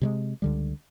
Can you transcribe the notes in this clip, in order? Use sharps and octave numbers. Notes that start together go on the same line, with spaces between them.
C3 G3 G#3
C#2 D3 G3